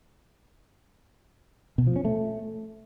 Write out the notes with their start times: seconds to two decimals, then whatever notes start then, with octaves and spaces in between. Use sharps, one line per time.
1.78 B2
1.87 F3
1.96 C#4
2.05 A3